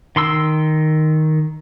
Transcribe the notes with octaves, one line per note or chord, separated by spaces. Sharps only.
D#3 C6 E6